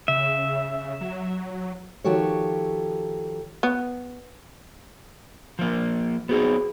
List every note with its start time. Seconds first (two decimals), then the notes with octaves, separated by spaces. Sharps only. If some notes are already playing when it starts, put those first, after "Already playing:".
0.08 C#3 E5
1.01 F#3
2.04 D#3 F3 F#4 G4 A4 C#5
3.63 B3
5.59 F3 A#3
6.29 B3 C4 D#4 F#4 G#4